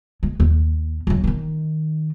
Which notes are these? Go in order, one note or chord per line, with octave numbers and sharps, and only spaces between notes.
G#3
D#2
C#2 F#3
D#3 D#4